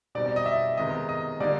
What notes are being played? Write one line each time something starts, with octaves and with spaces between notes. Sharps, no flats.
B2 G3 C4 D#4 D5
D5
D#5
E5
C3 D#3 G#3 B3 D#5
D#5
D3 G3 A#3 D#4 D5